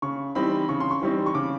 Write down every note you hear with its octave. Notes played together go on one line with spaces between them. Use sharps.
C#3 C#6
E3 G3 C4 D#4 B5
C#3 C#6
C6
C#6
E3 G3 C4 D#4
C#6
C#3 D6